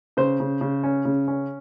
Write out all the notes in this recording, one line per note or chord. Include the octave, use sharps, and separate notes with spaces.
C#3 C5
C#3
C#3
C#4
C#3
C#4